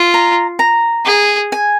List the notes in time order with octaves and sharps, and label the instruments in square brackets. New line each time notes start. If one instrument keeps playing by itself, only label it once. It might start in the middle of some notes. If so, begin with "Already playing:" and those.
Already playing: [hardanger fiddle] F4
[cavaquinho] A#5
A#5
[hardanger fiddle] G#4
[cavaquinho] G#5